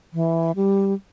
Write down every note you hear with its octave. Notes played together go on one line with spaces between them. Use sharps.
E3
G3